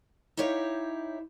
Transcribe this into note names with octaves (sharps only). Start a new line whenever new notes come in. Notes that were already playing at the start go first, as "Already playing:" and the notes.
D#4 E4 G4 C#5 F5